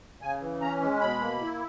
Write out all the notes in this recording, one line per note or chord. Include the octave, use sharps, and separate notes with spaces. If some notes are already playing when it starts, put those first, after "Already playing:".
C#3 G#5
E3
C#4 A#5
G#3
B2 B5
A#3
E4